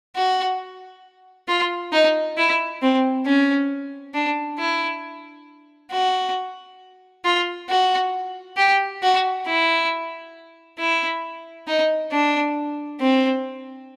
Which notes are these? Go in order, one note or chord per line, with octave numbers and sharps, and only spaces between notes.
F#4
F4
D#4
E4
C4
C#4
D4
E4
F#4
F4
F#4
G4
F#4
E4
E4
D#4
D4
C4